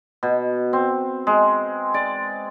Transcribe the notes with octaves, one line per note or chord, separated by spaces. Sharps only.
B2
C4
G#3
D5